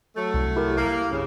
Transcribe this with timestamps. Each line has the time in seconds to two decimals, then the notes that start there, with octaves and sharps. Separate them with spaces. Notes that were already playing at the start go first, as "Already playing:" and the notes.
0.16 F#3 A3
0.34 C2
0.56 E4 G4 A#4
0.78 A#3
1.12 G2 C#3